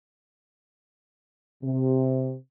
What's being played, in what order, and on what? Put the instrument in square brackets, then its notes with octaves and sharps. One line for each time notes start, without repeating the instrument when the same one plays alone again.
[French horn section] C3